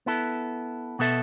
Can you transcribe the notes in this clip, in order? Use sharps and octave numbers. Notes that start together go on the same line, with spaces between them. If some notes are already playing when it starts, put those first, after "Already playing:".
B3 E4 A4
B2 B3 A4 E5